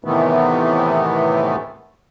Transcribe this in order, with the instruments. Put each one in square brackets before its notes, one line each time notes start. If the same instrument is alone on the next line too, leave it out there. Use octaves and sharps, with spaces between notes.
[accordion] A2 C3 D#3 E3 A3 B3